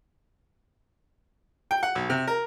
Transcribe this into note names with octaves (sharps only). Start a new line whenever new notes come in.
G5
F#5
B1
C3
A#4